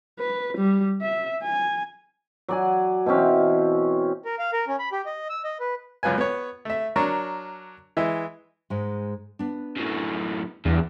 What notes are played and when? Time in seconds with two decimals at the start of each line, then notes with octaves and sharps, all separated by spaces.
0.20 B4
0.58 G3
1.01 E5
1.43 G#5
2.48 F#3 D5 G#5
3.06 B2 E3 C4 C#4
4.25 A#4
4.39 F5
4.53 A#4
4.68 C#4
4.79 B5
4.92 G4
5.06 D#5
5.30 E6
5.44 D#5
5.60 B4
6.03 C#2 F#2 F4 B4 G#5
6.18 B3 C#5
6.65 A3 E5
6.96 F#3 D4 A#4 C#6
7.97 E3 G#3 E5
8.70 G#2 G#3
9.39 B3 D4
9.76 F#2 A2
10.65 E2 G2